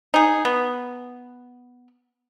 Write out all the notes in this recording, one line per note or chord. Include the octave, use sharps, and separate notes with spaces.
D#4 G#4
B3